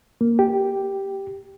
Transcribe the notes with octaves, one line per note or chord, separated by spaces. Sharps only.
A#3
G4